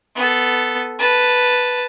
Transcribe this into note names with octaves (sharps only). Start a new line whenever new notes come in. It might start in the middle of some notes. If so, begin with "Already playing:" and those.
B3 A4
B4 A5